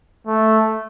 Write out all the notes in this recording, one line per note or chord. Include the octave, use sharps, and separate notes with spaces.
A3